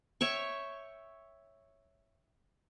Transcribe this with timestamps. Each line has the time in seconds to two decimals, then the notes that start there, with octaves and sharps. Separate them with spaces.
0.21 C#5 E5 G5 C#6